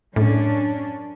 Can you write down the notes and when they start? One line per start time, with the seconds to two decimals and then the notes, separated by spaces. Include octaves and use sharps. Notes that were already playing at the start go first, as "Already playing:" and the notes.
0.16 F#2 A2 C#4 D4